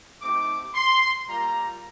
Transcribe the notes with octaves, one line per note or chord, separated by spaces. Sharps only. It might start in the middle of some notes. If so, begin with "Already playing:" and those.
A3 C4 D#4 G4 D6
C6
G3 A#3 F4 A#5